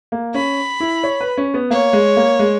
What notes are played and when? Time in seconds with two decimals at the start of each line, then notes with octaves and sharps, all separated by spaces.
0.12 A#3
0.34 C#4 B5
0.80 E4
1.03 C#5
1.20 B4
1.37 C#4
1.54 B3
1.70 A#3 C#5
1.93 G#3
2.17 A#3
2.39 G#3